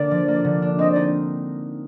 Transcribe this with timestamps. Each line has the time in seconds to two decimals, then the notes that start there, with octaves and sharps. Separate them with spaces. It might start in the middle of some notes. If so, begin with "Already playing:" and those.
Already playing: D3 A#3 D4 D5
0.11 F3
0.28 A#3
0.44 D3
0.62 D4
0.79 C4 D#5
0.91 D#4 D5